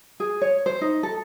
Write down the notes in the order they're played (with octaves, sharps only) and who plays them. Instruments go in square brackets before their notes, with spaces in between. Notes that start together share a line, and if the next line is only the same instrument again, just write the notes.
[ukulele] G#4
C#5
C5
D#4
A4